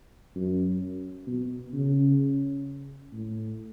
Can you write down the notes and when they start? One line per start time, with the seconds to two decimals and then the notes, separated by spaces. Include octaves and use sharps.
0.35 F#2
1.27 B2
1.73 C#3
3.12 A2